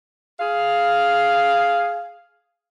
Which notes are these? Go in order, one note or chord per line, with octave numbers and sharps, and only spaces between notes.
G#4 F5